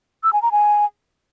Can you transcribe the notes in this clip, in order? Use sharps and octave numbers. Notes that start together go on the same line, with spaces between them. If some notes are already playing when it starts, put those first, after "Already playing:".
E6
G#5
A#5
G#5